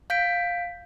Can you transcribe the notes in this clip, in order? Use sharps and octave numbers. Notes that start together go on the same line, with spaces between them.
F5 G6 B6 D7